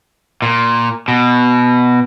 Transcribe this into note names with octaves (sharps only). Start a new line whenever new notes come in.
A#2
B2